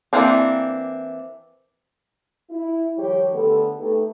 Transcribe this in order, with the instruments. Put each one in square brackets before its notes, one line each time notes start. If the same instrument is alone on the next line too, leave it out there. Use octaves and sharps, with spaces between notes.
[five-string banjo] E3 A#3 C4 D4
[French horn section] E4
D#3 F3 G3 G4 C#5
D3 A3 B3 D4 G4 A4
A3 B3 D#4 G4 A4 B4